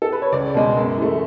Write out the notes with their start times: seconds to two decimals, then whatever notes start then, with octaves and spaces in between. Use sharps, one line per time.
0.02 A4
0.12 B4
0.22 C#5
0.32 C#2 D5
0.54 B2 G#3
0.76 F#2
0.97 E3 A3